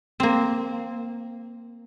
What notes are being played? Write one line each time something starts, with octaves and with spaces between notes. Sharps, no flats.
A#3 C4